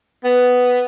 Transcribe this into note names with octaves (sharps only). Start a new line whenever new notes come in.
B3